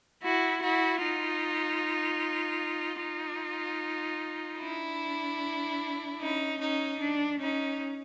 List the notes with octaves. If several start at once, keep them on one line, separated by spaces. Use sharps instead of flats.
E4 F#4
E4 F#4
D#4 F4
D#4 F4
D4 E4
C#4 D#4
C#4 D#4
D4
C#4 D#4